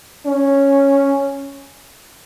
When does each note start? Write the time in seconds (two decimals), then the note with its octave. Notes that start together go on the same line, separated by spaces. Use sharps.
0.26 C#4